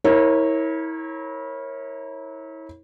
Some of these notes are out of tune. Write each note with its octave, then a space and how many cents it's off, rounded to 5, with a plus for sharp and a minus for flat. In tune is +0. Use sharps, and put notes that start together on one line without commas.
E4 -30 A#4 +0 C#5 -25